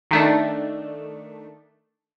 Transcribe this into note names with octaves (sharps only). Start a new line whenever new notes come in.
D#3 A3 D4